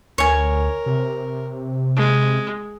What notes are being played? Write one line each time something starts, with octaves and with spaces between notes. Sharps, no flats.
D2 A#4 C#5 G#5
C3
G#3